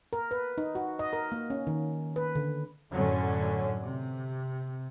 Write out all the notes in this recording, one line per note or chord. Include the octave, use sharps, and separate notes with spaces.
A#4
B4
D#4
F#4
D#5
A#4
A#3
C#4
D#3
B4
D3
F#2 A2 D3 F#3 C#4
C3